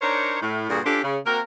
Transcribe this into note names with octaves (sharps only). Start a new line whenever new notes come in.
D4 D#4 A#4 C5 C#5
A2
G2 A#2 D3 F#4 G#4
C#4 D4 F4 G4 A4 C5
C#3
A#3 C4 F#4 A#4